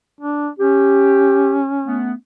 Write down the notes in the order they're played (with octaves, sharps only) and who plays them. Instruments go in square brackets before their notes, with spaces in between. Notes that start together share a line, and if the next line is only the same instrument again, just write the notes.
[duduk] D4
[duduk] C#4 [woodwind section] G4
[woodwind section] A3 B3